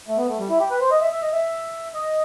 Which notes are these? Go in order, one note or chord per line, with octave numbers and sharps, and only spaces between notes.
A3
B3
A3
G3
E4
G4
B4
C5
D#5
E5
E5
D#5
E5
D#5